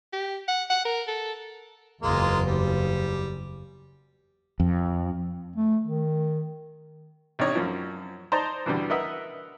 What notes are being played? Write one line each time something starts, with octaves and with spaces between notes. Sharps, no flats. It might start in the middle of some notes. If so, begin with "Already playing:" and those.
G4
F#5
F#5
A#4
A4
F#1 E2 G#3 A#3 F4
G3
F2
A3
D#3
A1 C3 D4 D#4 C#5
F#2 F3
D#4 C5 D5 A5 A#5
E2 B2 D3 G3
A#4 B4 D#5 E5 F#5